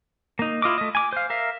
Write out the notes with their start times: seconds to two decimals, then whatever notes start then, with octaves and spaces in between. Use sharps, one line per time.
0.39 A#3 D#4
0.62 E4 F4 D#5 D6
0.78 A3 D#5
0.95 G#5 D6
1.13 C5 F5
1.30 A#4 E5 F5